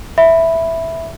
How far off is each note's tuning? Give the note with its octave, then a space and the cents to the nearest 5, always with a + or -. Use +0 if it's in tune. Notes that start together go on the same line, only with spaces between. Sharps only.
E5 +0 B5 +0